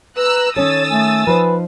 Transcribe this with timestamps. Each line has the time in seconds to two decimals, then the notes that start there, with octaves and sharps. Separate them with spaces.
0.16 B4 A#5 E6 F#6
0.56 D#3 C#4 A4 C#5 D#6 E6 A6
0.90 A3 G#5
1.27 F3 D#4 B4 C5